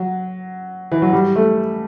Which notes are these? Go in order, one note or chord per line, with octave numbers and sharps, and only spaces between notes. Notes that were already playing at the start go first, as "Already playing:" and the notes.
Already playing: F#3
E3
F#3
G3
A3